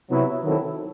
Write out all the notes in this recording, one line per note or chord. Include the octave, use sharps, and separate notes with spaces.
C3 F#3 B3 E4
D#3 F#3 C4 E4 A4